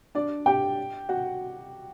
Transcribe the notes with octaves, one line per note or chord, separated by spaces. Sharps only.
D4 D5
G4 G5
F#4 F#5